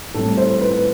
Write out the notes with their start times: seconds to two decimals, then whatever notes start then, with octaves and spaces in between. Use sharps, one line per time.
0.14 A2 G3 C4 A4
0.38 C5
0.61 B4